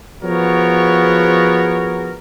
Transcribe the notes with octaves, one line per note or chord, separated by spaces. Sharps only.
F3 B3 F#4 G#4 A#4 C#5